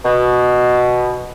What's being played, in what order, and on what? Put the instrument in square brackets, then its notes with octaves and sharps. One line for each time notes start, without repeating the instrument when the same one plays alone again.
[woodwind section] B2